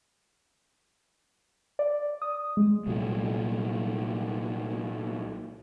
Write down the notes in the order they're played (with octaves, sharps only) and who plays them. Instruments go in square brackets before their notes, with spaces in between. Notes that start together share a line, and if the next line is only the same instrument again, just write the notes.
[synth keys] D5
D#6
G#3
[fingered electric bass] C2 A#2 F#3